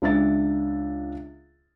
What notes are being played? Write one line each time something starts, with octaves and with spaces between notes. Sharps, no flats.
C#2 D4 E5 A6